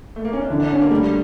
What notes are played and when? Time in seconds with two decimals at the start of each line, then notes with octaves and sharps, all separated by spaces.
0.16 A3
0.25 A#3
0.33 C#4
0.42 D4
0.50 D3 E4
0.60 D4
0.70 C#4 D4
0.81 A#3
0.91 G3 A3